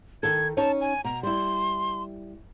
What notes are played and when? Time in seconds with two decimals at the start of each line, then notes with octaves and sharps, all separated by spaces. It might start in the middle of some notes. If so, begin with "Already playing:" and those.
0.23 D#3 A4 G#6
0.57 C#4 D#4 C#5 A5
0.81 G#5
1.04 B2 A#5
1.23 G3 E4 C6